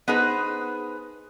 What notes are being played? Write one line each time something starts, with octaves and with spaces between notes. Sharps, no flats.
B3 D#4 G#4 B4 C5